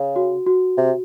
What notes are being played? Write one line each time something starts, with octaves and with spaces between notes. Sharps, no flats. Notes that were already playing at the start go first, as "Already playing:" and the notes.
Already playing: C#3
F#4
F#4
C3